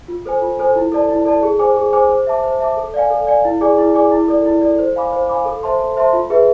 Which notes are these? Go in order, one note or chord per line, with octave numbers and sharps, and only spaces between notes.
F4
A4 C5 G#5
F4
A4 C5 G#5
E4
A4 D5 A5
E4
A4 D5 A5
G#4
C5 G#5 D6
G#4
C5 G#5 D6
C5
E5 A5 D6
C5
E5 A5 D6
A4
D5 F5 G#5
A4
D5 F5 G#5
E4
G#4 D5 G#5 D6
E4
G#4 D5 G#5 D6
E4
A4 D5
E4
A4 D5
C5
F5 G#5 B5 D6
C5
F5 G#5 B5 D6
A4
C5 E5 A5 C6
A4
C5 E5 A5 C6
F4
G#4 B4 E5